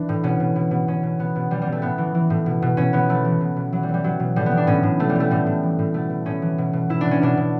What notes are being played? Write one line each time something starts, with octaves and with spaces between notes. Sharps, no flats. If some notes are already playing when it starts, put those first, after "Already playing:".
Already playing: E3 D4
A2
B2 C#4
B2
B2
B2
B2 C#4
B2
B2 B3
B2
B2 G3
G3
B2
A3
A2 B3
E3
E3
A2
B2
B2
B2 C#4
B2 B3
E3 A3
E3
B2
B2
E3 F#3
G3
E3
G3
B2 F#3
B2
A2 G3
B3
E3
D4
A2 C#4
A2
B2 A3
G3
B2 A3
A2 G3
A2
E3
A2
B2 A3
B2
A2 C#4
E3
B2
B2
B2 E4
B2 D4
C#4
B2 D4
B2